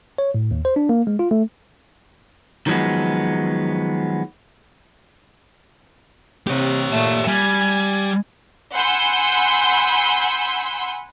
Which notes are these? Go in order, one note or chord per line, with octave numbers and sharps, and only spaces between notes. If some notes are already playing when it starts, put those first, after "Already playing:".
C#5
A2
D#2
C5
D4
A#3
G#3
F4
A3
D#3 F3 F#3 G#3 B3
C3 G4 C#5
A#2 A3
G3 G#5 G#6
F#5 G#5 B5 C6 E6 G6